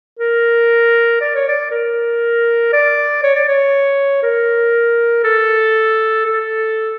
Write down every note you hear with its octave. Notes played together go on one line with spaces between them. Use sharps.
A#4
D5
C#5
D5
A#4
D5
C#5
D5
C#5
A#4
A4
A4